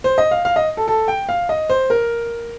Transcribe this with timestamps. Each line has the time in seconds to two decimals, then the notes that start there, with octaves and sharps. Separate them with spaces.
0.04 C5
0.18 D#5
0.31 F5
0.45 F5
0.56 D#5
0.77 A4
0.88 A4
1.08 G5
1.29 F5
1.49 D#5
1.70 C5
1.90 A#4